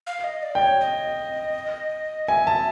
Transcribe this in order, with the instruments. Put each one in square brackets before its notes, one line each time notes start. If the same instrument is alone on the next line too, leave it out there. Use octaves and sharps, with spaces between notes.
[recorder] F5
D#5
D5
[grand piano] G5
[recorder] C#5
D#5
[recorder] E5 [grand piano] G#5
[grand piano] A5